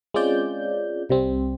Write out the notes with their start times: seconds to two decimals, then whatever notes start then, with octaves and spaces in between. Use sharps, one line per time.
0.14 G#3 C4 C#4 F4 D5 G6
1.09 C2 C3 G3 C4